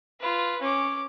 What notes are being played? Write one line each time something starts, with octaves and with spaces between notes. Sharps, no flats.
F4 B4
C#4 D6